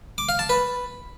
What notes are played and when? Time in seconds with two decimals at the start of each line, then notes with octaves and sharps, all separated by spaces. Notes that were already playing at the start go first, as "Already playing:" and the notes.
0.18 D6
0.29 F5
0.39 A5
0.49 B4